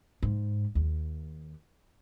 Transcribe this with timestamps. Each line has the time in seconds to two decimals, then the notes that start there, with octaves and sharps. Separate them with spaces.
0.23 G#2
0.75 D#2